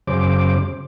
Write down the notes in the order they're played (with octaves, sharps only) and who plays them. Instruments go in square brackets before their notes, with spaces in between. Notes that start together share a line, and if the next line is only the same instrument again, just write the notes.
[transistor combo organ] F#2 C#3 C5 D6